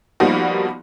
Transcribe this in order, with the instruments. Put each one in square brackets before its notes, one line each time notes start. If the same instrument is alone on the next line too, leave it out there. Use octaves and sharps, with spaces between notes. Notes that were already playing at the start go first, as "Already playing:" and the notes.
[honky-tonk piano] F3 G3 A#3 B3 D#4 F#4